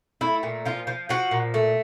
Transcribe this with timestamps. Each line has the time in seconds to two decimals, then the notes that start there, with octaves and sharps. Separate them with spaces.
0.21 A3 E4
0.43 A#2
0.65 F3 F4
0.87 F3
1.09 F3 F#4
1.31 A#2
1.54 A3